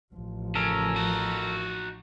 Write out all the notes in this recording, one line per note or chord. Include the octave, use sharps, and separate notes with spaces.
A1 F3
C#3 A4 A#4
D#4 F#4